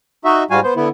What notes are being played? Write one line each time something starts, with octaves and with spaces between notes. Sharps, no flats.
D#4 F#4 E5
G#2 G3 F4 F#4 F5 G#5
B3 C5
D3 B3 E4